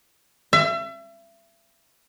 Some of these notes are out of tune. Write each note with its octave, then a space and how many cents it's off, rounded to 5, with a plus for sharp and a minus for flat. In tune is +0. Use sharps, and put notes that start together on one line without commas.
E5 +35